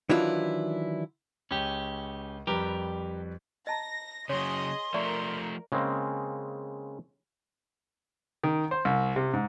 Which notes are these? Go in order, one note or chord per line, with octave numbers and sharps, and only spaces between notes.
D#3 E3 F#3 D4 E4 F4
C#2 C#4 G4
F2 G3 G4 A#4 B4
D#5 A5 A#5 A#6
C#3 F#3 G#4 C#5 D#5 C6
F3 A3 A#4 D5 E5 C#6
C#3 G#3 A#3 C4
D#3
C5
C2
C3
G#2